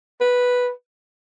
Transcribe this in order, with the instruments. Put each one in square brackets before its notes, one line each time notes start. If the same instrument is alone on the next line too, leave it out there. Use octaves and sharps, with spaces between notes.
[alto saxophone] B4